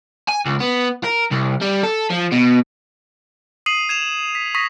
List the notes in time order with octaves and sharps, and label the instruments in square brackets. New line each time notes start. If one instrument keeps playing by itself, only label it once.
[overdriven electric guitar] G#5
C#2
B3
A#4
C2
G3
A4
F3
B2
[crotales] D#6 C7 D#7 F#7
G#6 E7 F7
B6
C#6 D#6 A#6 B6